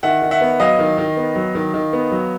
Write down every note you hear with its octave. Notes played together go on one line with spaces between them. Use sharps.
D#3 E5 F#5
D#3
E5 F#5
B3
F#3 D#5 F5
D#3
D#3
B3
F#3
D#3
D#3
B3
F#3